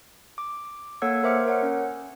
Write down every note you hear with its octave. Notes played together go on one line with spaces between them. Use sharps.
D6
A#3 A4 C#5 F#5 E6 G#6
A#4 C5 E5 D6 F6 C#7
A#4 C#5 F#5
C#4